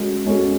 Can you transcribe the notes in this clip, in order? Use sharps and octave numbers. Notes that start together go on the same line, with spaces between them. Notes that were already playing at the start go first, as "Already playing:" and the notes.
Already playing: G#3 C#4 F#4 A4
G#3 C#4 F#4 A4